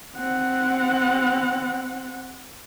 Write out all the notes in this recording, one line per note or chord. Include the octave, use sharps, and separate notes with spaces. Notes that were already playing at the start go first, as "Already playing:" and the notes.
C4 F#5